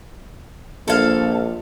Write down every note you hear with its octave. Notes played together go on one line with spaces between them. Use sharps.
A#1 A4 F5